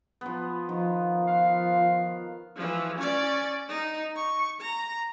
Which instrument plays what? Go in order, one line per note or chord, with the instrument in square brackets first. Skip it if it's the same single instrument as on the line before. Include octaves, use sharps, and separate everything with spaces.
[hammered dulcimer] F3 B3
[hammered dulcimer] D#3 [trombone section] F3 [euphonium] F4
[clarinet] F5
[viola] E3 F3
C#4 D5
D#4
C#6
A#5